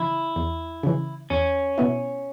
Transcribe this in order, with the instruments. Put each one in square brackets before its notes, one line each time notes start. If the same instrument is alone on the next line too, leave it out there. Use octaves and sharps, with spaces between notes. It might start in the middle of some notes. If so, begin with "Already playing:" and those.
Already playing: [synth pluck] C#3 E3 [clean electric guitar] E4
[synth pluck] E2
C#3 E3
[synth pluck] E2 [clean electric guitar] C#4
[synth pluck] B2 B3 E4